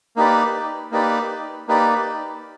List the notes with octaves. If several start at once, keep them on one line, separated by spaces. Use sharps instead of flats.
A#3 D#4 G4 B4 D5
A#3 D#4 G4 B4 D5
A#3 D#4 G4 B4 D5